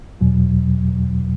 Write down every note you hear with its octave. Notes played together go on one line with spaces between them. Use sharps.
E2 B2 F#3